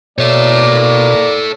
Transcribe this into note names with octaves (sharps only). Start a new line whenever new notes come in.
B2 A#3 A4 C#5 D5